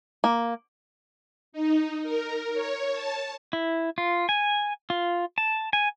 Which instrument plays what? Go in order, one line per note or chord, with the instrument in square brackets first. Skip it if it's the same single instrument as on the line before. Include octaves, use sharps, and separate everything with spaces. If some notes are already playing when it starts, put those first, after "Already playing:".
[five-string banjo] A#3
[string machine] D#4
A#4
C#5
A5
[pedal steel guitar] E4
F4
G#5
F4
A5
G#5